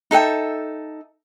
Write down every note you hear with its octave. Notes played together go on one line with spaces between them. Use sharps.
D#4 A4 E5 G5